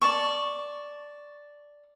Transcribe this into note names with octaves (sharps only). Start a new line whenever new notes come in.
D5 A5 C#6